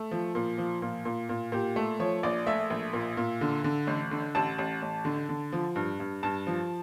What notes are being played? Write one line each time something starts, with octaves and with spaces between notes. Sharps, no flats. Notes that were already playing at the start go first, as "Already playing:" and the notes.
Already playing: A3
F3
A#2
F3
A#2
A#2
A#2
A#2 G4
A3
F3 C#5
A#1 D5
A3 E5
A#1
A#2
A#2
D3
D3
A1
D3
A1 A5
A1
A1
D3
D3
F3
G2
G2
G2 A5
F3